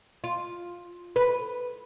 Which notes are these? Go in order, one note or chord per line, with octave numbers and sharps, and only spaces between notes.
F4
B4